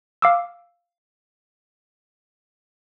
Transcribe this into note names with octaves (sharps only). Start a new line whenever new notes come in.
F5 D6 E6